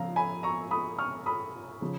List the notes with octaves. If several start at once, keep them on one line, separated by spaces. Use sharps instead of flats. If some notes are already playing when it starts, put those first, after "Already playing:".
Already playing: C#3 F3 F5 A#5
G#5 B5
A#5 C#6
B5 D#6
C#6 F6
B5 D#6
C#3 F3